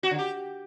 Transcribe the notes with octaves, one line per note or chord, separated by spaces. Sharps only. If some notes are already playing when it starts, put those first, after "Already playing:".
F#4
D3
G4